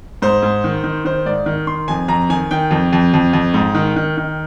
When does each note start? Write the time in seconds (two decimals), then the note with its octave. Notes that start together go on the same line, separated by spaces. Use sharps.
0.22 G#2 C5
0.42 G#2
0.64 D#3
0.84 D#3
1.05 D#3 C5
1.26 G#2 D5
1.46 D#3
1.67 D#3 C6
1.88 F2 G#5
2.08 F2 A#5
2.29 D#3 G#5
2.51 D#3 G5
2.71 F2
2.92 F2
3.13 F2
3.33 F2
3.54 G#2
3.75 D#3
3.96 D#3
4.17 D#3